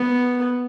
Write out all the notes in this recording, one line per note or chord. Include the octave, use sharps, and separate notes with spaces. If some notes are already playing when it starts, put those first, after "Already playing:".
Already playing: B3